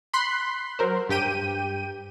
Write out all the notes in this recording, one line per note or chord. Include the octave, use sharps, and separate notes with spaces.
B5 C6 F#6 C7
F#3 A#4 C5
G2 G4 G5 D#7